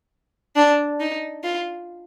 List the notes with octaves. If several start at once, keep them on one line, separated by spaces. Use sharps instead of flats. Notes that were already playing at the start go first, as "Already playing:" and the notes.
D4
D#4
F4